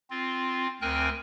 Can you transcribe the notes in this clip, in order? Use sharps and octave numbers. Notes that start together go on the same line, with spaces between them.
C4 F4
D2 C4 A#4 G5 G#5 F#6